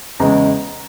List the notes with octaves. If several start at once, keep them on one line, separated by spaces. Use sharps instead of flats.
E2 C#3 G#3 A#5